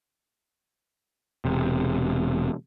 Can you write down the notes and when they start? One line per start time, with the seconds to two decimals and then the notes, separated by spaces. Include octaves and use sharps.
1.45 E1 C3